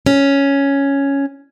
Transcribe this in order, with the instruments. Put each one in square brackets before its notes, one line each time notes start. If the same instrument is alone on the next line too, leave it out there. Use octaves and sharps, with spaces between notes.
[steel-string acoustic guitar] C#4